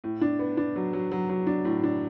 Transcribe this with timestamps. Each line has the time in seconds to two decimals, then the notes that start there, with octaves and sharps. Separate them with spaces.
0.04 A2
0.21 D4
0.39 B3
0.57 D4
0.76 F#3
0.93 F#3
1.11 F#3
1.29 F#3
1.47 D4
1.65 A2
1.83 D4